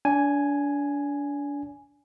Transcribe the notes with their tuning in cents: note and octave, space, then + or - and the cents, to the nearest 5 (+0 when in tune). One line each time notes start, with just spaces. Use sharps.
D4 -35 G#5 +0